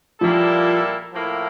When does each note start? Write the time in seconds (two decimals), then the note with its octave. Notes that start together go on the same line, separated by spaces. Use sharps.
0.21 A#2 F3 G3 A#3 E4 A4
1.13 A2 F3 A#3 E4